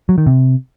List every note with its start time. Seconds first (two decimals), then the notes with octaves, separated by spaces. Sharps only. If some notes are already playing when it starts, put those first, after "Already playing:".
0.09 F#3
0.18 D#3
0.27 C3